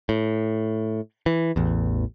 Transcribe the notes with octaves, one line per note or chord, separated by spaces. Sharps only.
A2
E3
A1 E2